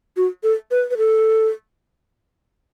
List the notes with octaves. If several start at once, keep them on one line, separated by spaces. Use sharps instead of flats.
F#4
A4
B4
B4
A4